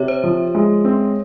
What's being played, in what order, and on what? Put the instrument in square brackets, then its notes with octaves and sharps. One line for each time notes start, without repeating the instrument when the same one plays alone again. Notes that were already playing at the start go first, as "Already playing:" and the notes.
Already playing: [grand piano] C3 [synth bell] C#5 E5
[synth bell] C5
[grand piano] F3
G#3
C4